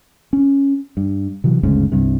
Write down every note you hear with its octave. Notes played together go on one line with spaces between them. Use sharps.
C#4
G2
C3 E3 F#3
G1 D2 G#2 C#3
C2 G2 C3